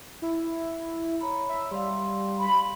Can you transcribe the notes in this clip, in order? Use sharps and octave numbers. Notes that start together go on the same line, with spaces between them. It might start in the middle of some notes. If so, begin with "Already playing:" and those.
E4
C#5 A#5 B5
E5
G3 F5 C6
B5